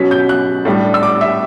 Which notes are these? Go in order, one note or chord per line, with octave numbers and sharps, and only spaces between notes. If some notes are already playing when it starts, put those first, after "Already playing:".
Already playing: B2 F#3 C#4 B6
G6
F#6
A2 G3 D4
E6
D6
E5